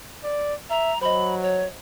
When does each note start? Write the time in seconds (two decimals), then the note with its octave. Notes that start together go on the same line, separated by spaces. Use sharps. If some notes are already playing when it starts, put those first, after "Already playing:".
0.23 D5
0.70 E5 A#5
1.01 F#3 C5 D#5 B5
1.42 C#5